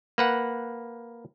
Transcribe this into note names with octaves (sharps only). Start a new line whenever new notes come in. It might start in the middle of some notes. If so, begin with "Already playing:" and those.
A#3 B4 F#5